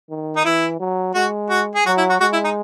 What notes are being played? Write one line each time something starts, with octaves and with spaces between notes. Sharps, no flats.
D#3
D#4
E3 E4
F#3
G#3 F#4
F#4
G#4
F#3 F#4
E4
F#4
G#3 F#4
E4
D#4